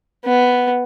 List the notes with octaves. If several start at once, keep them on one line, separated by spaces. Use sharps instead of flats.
B3